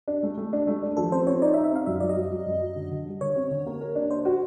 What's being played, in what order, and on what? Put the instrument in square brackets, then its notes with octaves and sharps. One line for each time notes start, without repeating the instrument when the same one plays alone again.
[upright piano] D4
A3
A3
D4
A3
D4
[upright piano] F3 [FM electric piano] A4
[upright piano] C4 [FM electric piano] C5
[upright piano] C4 [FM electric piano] C#5
[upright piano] D#4 [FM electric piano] D5
[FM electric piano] E5
[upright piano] D#4
[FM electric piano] E5
[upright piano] C4 [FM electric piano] F5
[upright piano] F#2 [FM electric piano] E5
[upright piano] F#3 [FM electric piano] D5
[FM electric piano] D#5
[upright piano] F#3
F#3
F#2
F#3
D3
D3
G3
[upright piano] D3 [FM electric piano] C#5
[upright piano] C4
D3
A#3
A#4
D4
[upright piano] D4 [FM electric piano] C5
[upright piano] F#4